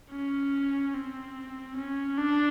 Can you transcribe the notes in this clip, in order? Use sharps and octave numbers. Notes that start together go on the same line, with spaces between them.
C#4
C4
C#4
D4